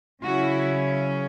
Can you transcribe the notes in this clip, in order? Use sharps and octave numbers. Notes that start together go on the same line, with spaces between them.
C#3 F#3 C#4 E4 F#4